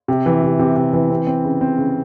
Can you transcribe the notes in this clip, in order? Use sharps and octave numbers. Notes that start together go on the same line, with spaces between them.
C3
E3
C3
C3
C3
E3
C4
C4
C#3
C4
C#3